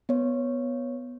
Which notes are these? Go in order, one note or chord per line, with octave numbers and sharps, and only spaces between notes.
B3 C#5